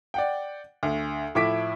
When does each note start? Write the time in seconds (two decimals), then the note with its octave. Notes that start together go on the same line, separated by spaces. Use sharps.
0.14 D5 F#5 G5
0.83 D2
1.35 A2 F3 E4 D6 B6 D7